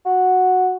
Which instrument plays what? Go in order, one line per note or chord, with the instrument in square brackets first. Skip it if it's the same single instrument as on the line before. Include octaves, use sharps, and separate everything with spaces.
[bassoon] F#4